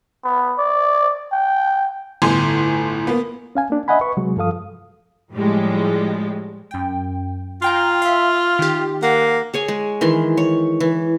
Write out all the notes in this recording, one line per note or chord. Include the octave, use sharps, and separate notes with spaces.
B3
D5
G5
G1 A2 G#5 C6
A#3 B3
C#4 F5 G#5
A#3 D4
D#5 E5 F#5 G#5 B5
B4 C#6
C3 F#3 G#3
G2 F3 A4 F5 D#6
A2 F3 G3 G#3
F#2 G5
F4 F5 G5 A#5
E5 F5
D#3 G4
A#3 F#5
G#4 C#5 G#5
G#3
D#3 E3 C6
C#5
E3